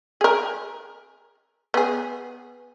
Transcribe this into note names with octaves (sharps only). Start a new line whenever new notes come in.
G#4 A#4
B3 G#4